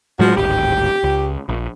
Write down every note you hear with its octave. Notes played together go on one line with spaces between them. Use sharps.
A2 F3 F#3 G#3 F#4
D1 G#1 G4
C#2
A#1